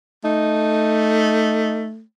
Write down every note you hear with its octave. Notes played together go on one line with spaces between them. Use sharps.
A3 D#4